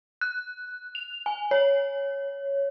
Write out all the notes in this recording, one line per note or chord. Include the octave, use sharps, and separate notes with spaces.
F#6
F7
G#5
C#5